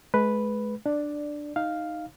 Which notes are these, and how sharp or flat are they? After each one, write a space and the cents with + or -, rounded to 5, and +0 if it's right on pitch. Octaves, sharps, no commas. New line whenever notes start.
G#3 +35 B4 +0
D4 +10 D5 +0
D#4 +0 F5 +0